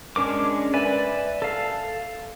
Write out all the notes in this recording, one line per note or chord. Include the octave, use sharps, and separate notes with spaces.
G#3 C#4 D4 A#4 D6
B4 D5 E5 G#5 B5
A4 F5